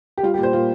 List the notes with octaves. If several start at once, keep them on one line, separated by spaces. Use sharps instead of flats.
G4
G3 F4
G4
A#2 C5
A#2 F4